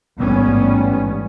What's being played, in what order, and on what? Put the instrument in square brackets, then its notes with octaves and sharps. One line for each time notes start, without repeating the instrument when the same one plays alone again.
[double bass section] A1 G#2 G3 B3 C#4